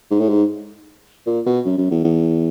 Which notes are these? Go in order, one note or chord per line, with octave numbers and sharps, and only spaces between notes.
G#2
A2
G#2
A#2
B2
F#2
F#2
E2
E2